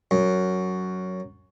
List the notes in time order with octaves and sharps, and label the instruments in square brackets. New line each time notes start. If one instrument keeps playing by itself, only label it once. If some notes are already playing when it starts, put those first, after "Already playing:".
[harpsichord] F#2